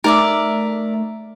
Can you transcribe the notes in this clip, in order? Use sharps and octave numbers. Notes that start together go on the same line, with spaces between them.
A3 D#4 A#4 D5 E5 D6